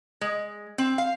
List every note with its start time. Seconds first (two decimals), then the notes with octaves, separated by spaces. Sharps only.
0.21 G#3
0.78 C4
0.98 F5